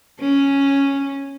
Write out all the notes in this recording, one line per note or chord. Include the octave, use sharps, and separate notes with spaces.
C#4